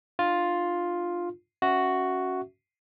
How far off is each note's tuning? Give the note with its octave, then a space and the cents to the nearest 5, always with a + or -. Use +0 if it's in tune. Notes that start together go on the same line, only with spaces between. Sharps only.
D4 +45 F4 +5
C#4 +0 F#4 +0 E5 +0